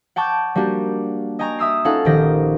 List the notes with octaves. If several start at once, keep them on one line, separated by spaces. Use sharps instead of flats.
F#5 G5 A5 C#6 D6 G6
G3 A#3 D4 F#4 G4
D#5 G5 G#5 A#5 C#6
E5 D#6 E6 C7
C#4 D#4 F4 A4 F5 F#5
A#1 D#3 G4 A#6